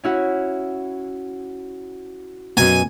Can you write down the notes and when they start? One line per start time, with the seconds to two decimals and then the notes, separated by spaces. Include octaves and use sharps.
0.04 C#4 E4 F#4
2.57 F#2 B2 G#5 A#5